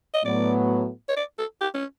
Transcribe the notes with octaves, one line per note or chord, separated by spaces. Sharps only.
D#5
A2 F#3 B3 D5
C#5
D5
A4
G4
C#4